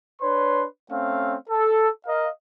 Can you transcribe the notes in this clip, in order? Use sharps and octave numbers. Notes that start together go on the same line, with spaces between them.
D4 B4 C#5 C6
A3 C4 C#4 F5
A4
A#4 D#5 F5